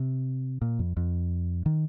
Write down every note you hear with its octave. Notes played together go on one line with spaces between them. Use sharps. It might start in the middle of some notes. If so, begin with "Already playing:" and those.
Already playing: C3
A#2
F2
F2
D#3